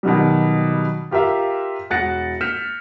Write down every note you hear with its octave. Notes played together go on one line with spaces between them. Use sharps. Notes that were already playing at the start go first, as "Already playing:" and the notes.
B2 D#3 F#3 G3
F4 G4 A#4 E5 F5
E1 F#4 F#6 A6 A#6 C#7
F6 G6 B6 C#7 E7